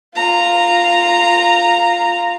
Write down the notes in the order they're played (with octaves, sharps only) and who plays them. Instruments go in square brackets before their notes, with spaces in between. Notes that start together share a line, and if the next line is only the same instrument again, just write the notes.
[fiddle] F4 A#5